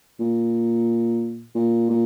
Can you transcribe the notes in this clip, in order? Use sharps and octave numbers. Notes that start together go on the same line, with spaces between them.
A#2
A#2
A#2